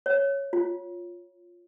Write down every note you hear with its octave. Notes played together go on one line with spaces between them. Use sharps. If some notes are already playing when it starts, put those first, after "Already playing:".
C#5
F4